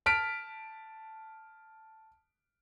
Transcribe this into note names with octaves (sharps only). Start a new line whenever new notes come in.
A5 F6 B6 D7